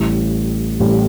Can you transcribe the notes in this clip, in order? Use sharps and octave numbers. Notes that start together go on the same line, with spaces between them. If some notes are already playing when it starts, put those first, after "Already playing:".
Already playing: A1 A2 G3
A1 A2 G3